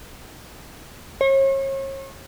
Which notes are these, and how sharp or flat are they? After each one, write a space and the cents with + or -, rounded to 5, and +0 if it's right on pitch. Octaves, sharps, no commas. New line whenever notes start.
C#5 -40